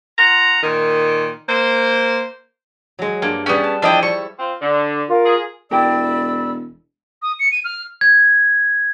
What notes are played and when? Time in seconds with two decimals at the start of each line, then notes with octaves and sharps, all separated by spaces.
0.18 F4 F#5 A#5
0.62 A#2 D#3
1.48 A#3 C5
2.99 F#3 G#3
3.22 G2 A#3
3.46 G3 B3 C#4 G#4 G5
3.64 A5
3.82 F3 D4 E4 D#5 G5
4.03 G3 C#6
4.39 C4 F4
4.61 D3
5.09 F4 A#4
5.24 G#4
5.71 E1 E4 G4 A#4 D5 B5 E6
7.22 D#6
7.39 C#7
7.52 D#7
7.64 F6
8.01 G#6